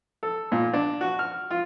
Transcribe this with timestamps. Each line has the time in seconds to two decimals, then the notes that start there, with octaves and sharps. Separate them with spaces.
0.23 A4
0.52 A#2
0.73 D4
1.01 F#4
1.19 F6
1.50 F4